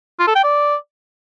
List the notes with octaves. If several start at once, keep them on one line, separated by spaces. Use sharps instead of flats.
F4
A4
G5
D5